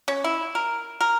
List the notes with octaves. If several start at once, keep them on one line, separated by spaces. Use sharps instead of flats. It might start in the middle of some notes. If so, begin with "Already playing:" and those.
C#4
E4
A#4
A#4